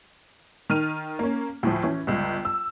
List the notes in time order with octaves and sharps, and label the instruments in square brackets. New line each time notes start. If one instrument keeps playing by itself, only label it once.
[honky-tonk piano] D#3 F6 D#7
A#3 C#4
D2 A2 F3
E3 C#4
G1 C#2
E6